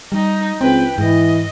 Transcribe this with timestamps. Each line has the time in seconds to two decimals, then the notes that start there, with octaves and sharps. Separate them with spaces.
0.12 G3 D#4
0.61 C#2 C4 B4 G5
0.98 G#2 E3 D#5